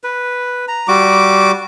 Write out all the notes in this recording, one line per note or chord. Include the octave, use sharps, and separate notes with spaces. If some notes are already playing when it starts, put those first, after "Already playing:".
B4
A#5
G3 F#4 D6